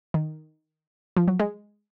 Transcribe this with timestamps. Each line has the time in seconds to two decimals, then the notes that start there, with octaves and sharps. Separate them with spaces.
0.14 D#3
1.17 F3
1.28 F#3
1.39 G#3